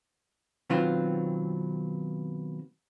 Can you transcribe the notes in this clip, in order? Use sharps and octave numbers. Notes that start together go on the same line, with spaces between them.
B2 D#3 F#3 B3 C4 F4